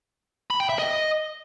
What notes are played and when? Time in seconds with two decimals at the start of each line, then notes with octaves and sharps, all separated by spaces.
0.50 B5
0.60 G5
0.69 E5
0.79 D#5